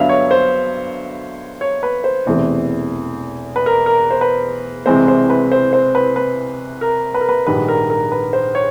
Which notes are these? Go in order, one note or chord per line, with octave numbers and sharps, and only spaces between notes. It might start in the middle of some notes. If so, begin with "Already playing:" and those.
Already playing: G2 D3 F#3 B3 E5 F5
C#5
C5
C#5
B4
C5
E1 E2 C3 E3 A3
B4
A#4
A#4
C5
B4
C2 C3 E3 G#3 C4 C5
C5
B4
C5
C5
B4
B4
A#4
B4
A#4
B4
A#1 G#2 D#3 G3 B4
A#4
A#4
B4
C5
C#5